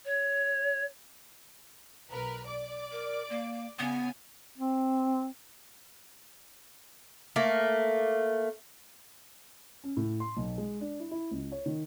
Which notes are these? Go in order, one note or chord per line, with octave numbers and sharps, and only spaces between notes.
C#5
B1 A#4 B4
D5 D6
A#4
A#3
C#3 B3 G#5
C4
A3 A#3
C#4
A2
C6
B1
G#3
D4
E4
E4
C#2
C#5
D#3